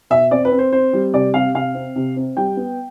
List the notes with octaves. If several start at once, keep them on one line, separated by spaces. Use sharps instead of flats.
B2 E5
C4 D5
B4
C4
C5
C4 C5
G3
C3 D5
C3 F5
C3 F5
C4
C3
C4
G3 G5
B3